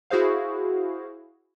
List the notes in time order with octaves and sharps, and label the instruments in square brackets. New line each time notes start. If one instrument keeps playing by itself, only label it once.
[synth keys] E4 F#4 G#4 C5 F5